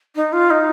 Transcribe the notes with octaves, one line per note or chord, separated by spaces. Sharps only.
D#4
F4
D#4